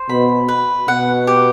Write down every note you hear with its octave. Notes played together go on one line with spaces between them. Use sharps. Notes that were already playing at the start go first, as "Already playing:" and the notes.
Already playing: C5
B2 B5
B4
B2 F#5
G4